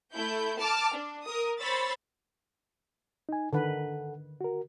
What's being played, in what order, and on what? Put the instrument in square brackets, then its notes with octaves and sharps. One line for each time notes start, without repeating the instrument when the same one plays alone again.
[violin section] A3 E4 G6
A5 D6 F6
D4
A#4 D#6
C5 C#5 B5 E6 A6
[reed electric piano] D#4 G#5
[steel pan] D3 D#3 B4 [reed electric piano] A4 F#5
[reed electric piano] F#4 A#4